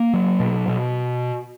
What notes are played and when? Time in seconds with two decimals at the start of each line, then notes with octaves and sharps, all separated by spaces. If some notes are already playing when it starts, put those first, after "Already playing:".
Already playing: A#3
0.14 F#3
0.40 B2
0.68 B2